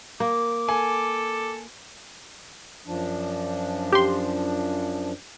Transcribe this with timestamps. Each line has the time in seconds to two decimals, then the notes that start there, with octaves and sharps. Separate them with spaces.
0.20 A#3 D6
0.69 A4 G#5
2.87 F#2 F3 D4
3.92 G4 C6